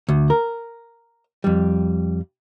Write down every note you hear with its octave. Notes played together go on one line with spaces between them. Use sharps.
D2
A#4
F2 G3